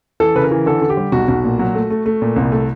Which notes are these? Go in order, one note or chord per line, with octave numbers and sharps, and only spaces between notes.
E3 A4
C#3 B4
A#4
E3
D3 A4
D3
G4
G3
B1 F#4
B1
A#2
F#3
A3
A3
A3
A#2
C2
A3